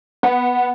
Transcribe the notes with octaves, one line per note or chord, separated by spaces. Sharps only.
B3